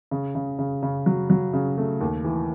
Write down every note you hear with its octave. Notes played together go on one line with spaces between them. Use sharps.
C#3
C#3
C#3
C#3
F#3
F#3
C#3
A3
D#2
E3